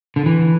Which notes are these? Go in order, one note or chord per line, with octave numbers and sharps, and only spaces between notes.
D3
E3